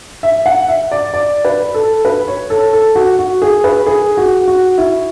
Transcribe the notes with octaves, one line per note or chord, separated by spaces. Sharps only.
E5
F#5
E5
D5
D5
B4
A4
B4
C#5
A4
A4
F#4
F#4
G#4
B4
G#4
F#4
F#4
E4